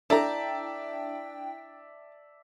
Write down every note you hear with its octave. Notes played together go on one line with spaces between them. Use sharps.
D4 E4 A4 D5 E5 G5 A5 A#5